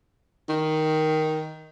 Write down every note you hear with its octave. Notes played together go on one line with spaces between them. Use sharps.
D#3